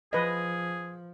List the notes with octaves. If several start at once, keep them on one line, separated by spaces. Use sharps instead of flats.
F3 G#4 B4 D#5